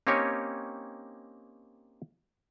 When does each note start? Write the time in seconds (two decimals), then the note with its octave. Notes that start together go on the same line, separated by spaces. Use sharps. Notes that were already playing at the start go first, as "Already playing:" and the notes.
0.07 A#3 C4 C#4 D#4 G4 C#5